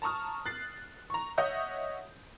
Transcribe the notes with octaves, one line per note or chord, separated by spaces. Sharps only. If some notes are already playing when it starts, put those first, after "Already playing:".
A5 A#5 C#6 D#6 F6
F#6 A6 C7
A#5 C#6
C#5 D#5 E5 F#5 D#6 G6